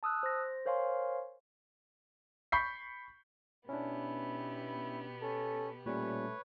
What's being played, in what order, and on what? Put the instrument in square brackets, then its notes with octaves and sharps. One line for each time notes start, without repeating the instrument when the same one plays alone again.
[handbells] A5 D#6 E6 F#6
C5 A#6
A#4 C5 C#5 F5 G#5 C6
[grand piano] B5 C#6 G6 B6 C7
[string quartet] B2 B3 G4 [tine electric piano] C#4 D4 [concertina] E4
[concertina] C#4 [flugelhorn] A4
[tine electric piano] A#2 G3 C#4 [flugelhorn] A3 [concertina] B4 C#5